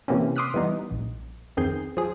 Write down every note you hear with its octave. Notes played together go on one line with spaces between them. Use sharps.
C3 E3 A#3 C4 C#4
C6 D6 D#6 F6 F#6 B6
E3 G3 B3 D#4
A#1
F2 D#3 C4 G#4 G6 C7
F3 G#4